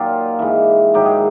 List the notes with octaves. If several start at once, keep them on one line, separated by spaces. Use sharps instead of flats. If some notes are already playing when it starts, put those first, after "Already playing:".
Already playing: A#2 F#3 D#4 F4 G4
G#2 E3
G#2 D#3 F#3 G4
G#4